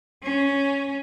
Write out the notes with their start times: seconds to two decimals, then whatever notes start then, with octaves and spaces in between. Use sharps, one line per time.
0.23 C#4